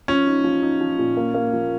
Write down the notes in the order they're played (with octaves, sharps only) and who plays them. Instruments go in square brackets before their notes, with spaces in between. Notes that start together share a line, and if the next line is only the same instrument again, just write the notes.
[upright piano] F3 [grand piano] C#4
[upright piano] D#4
F3
D#4
F3
A#2
A#3
A#3
F3